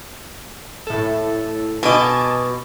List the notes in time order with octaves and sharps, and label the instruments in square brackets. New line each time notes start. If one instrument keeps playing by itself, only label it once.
[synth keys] A2 A4
[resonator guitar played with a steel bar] B2 D#5 [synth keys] G#5 A5 D6